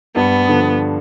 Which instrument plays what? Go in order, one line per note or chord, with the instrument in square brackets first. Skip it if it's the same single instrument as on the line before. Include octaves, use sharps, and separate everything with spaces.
[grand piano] G2 [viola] B3
[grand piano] D3 F3